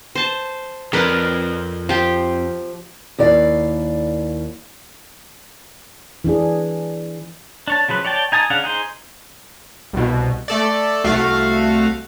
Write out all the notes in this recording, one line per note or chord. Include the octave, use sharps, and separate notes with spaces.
C5 A5
F2 A#4 B4 D5
F3 G4
D#2 E4 D5 F5
E3 D4 G#4
D4 C#5 A5
C#3 F3 F#3 B4
C#5 D5 G5 A5
D#4 G#5 A5 D#6
C#3 D4 F5 F#5
D#4 G#4 C5
C2 B2
A3 A4 D5
C2 A3 F#4 F5